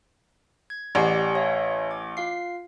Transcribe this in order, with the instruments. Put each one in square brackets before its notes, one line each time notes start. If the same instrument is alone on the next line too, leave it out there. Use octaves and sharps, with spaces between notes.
[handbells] G#6
[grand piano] A1 [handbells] G4 D5 F#5
[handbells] C#5 E5 F5
D6
F4 F5 C7